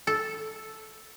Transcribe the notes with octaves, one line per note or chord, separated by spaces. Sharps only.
A4